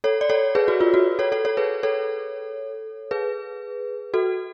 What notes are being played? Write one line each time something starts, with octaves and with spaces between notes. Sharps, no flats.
A4 C#5
D5
A4 C#5
G#4 B4
F#4
F4
F#4
A4 C#5
A4 C#5
A4 C#5
G#4 B4
A4 C#5
G#4 B4
F#4 A4